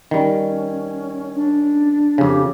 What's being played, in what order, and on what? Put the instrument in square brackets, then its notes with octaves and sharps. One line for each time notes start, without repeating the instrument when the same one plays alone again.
[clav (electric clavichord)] D#3 G3 [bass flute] C#4
[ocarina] D4
[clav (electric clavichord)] F2 C#3 [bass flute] G4